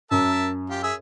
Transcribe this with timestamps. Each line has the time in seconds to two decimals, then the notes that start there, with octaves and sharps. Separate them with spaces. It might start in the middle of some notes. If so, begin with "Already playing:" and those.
0.11 F#2 A#4 E5 A5
0.70 F4 G4
0.83 G#4 E5